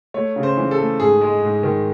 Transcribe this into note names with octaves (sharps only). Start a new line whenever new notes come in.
A3 C#5
C#3
C5
E3
A4
A3
G#2 G#4
G#3
G#2
D#3